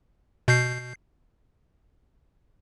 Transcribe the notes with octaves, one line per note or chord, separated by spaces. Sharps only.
B2 G6 C7